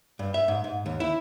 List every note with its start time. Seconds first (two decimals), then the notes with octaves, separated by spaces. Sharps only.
0.19 G2
0.34 E5
0.48 G#2
0.64 G#2
0.86 D#2
1.00 E4